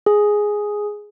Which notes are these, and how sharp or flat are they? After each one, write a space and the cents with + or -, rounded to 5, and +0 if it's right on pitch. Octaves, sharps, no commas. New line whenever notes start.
G#4 +0